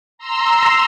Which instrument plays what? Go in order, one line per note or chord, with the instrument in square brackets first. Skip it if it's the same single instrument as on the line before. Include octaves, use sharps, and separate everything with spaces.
[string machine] A#5 C6 E6